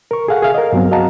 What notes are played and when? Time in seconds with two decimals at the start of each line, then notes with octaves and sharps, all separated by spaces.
0.11 A#4 C#6
0.28 G#4 A4 F5 F#5
0.42 G#4 E5 F5
0.54 A#4 D#5
0.73 G2 F#3 B3 C4
0.91 F#4 D#5 F5 F#5 A5 A#5